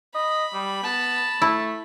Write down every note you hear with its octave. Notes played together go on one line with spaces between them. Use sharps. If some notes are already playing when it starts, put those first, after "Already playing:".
D#5 B5
G3
B3 A5
A3 E4